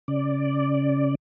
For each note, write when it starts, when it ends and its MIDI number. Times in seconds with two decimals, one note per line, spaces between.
0.08 1.15 49
0.08 1.15 74